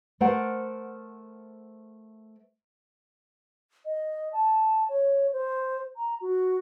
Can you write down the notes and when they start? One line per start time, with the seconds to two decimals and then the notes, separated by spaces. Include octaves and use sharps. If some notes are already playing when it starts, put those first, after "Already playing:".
0.20 A3 A#4 C5 F#5
3.85 D#5
4.33 A5
4.89 C#5
5.33 C5
5.97 A#5
6.21 F#4